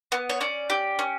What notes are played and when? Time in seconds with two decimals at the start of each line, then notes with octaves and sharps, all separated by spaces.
0.12 B3
0.29 C#5
0.41 C#4 D5
0.70 G4
0.99 C#4